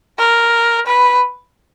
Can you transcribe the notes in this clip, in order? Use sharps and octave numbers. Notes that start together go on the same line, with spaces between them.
A#4
B4